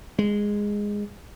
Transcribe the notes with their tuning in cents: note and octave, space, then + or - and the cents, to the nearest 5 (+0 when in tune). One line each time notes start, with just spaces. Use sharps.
G#3 -10